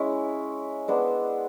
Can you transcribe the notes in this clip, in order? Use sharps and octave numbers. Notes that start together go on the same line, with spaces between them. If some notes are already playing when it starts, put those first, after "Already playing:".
Already playing: G#3 C#4 E4
G#3 B3 D4 C5